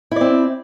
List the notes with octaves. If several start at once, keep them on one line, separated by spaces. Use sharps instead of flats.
C4 E4 D5